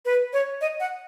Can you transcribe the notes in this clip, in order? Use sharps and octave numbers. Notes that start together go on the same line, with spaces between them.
B4
C#5
D#5
F#5